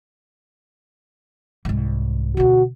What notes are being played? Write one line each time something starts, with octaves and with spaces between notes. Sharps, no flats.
C2 G#2
D2 B2 F#4